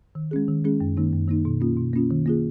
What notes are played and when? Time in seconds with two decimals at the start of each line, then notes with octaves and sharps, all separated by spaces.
0.15 D#3
0.31 G#3 C#4 G#4
0.48 D#3
0.64 G#3 C#4 G#4
0.81 F#2
0.97 D#3 A#3 D#4
1.13 F#2
1.28 D#3 A#3 D#4
1.45 B2
1.61 A#3 C#4 F4
1.77 B2
1.93 A#3 C#4 F4
2.10 D#3
2.26 A#3 F4 G#4